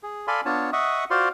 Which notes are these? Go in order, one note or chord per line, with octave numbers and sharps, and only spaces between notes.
G#4
A4 D5 F5 G#5 B5 C6
B3 D4 F4 C#5 A5
D#5 E5 F#5 C#6 D#6
F4 F#4 C5 D5 F5 C6